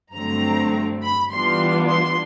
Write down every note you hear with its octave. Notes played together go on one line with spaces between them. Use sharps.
G2 D3 F#3 A3 C4 A#5
B5
E3 G3 B3 D4 F4 C6
C6